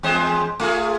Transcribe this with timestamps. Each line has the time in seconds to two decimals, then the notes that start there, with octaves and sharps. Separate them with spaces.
0.03 E2 G#3 C5
0.60 A3 F4 G#4